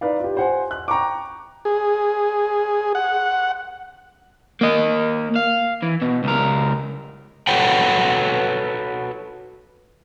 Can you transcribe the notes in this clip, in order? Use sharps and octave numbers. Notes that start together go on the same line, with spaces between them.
D#4 B4 D5 F5
F4 G4
C5 F#5 G#5
F#6
G5 A#5 C#6 D6
G#4
F#5
A#3 D#5
F5
E3
B2
C#2 A#4
F#4 A4 B4 C#5 F#5 G5